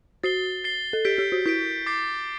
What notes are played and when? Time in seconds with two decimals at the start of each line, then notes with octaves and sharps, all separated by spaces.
0.23 F#4 A6 C7 G7
0.64 A6 C7 G7
0.93 A4
1.05 G4 G6 B6 D7
1.18 G4
1.32 F#4
1.46 E4 G6 B6 D7
1.86 D6 A6 C7